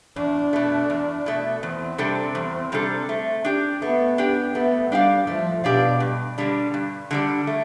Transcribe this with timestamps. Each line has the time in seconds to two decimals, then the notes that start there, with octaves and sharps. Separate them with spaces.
0.16 E2 D4
0.53 B2 A3
0.90 E2
1.26 B2 A3
1.63 E2 C4
1.98 C3 G3 D4 A4
2.35 E2
2.72 C3 G3 D4 A4
3.09 A3
3.45 D4 G4
3.82 A3 B3
4.18 D4 G4
4.54 A3 B3
4.91 G3 D4 G4 D5 F5
5.27 F3 A3
5.64 B2 D4 G4 D5 F5
6.00 G2
6.38 D3 G3 D4
6.74 G2
7.11 D3 G3 D4
7.47 A3